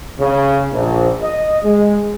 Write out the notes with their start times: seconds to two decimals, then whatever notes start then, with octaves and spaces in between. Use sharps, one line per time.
0.19 C#3
0.72 A#1
1.22 D#5
1.63 G#3